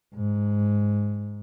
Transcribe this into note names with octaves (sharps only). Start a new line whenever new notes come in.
G#2